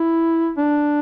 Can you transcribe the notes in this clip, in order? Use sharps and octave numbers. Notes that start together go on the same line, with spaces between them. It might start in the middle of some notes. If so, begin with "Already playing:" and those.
Already playing: E4
D4